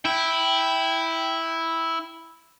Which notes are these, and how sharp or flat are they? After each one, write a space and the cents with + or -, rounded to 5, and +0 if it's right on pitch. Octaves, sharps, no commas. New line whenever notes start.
E4 -5 G5 +0